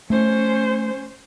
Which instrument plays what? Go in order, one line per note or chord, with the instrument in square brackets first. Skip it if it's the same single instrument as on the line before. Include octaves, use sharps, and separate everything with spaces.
[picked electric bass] A3 [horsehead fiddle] C#4 C5